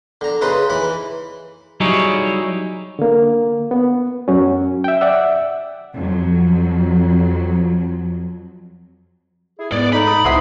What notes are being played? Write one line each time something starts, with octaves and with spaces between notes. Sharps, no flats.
D3 A#5
C#3 D#4 B4 C6
E3 B5
F#3 G3 D#4 E4 G#4 C#5
D3 A#3
B3
F#2 F#3 C#4
E5 G5
D5 E5 F#5 E6
F2 F#3
E4 G#4
G#2 B3 D5
A3 D#4 B5
A#5 D#6
C2 C4 E4 C5 F#5 C6 D#6